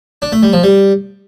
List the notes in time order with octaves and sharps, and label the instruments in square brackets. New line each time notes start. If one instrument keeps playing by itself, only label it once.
[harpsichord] D4
A3
G3
F3
G3